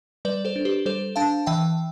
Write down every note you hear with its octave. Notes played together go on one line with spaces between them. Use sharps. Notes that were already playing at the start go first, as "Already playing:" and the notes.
G3 B4 D5
A4 C5
D4
G4 B4
G3 A4 C5
D4 F5 A5
E3 E5 G5